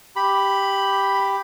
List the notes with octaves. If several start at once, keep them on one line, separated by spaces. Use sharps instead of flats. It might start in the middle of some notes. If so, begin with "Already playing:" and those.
G4 B5